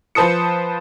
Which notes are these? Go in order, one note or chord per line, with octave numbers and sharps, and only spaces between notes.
F3 B4 C5 A5 D#6 C#7